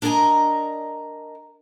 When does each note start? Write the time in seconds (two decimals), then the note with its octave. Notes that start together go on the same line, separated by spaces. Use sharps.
0.02 D4 A#4 D5 D#5 G#5 A#5